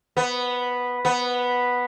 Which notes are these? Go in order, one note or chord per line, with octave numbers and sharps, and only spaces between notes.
B3
B3